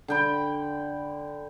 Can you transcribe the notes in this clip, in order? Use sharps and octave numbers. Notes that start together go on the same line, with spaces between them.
D3 G5 B5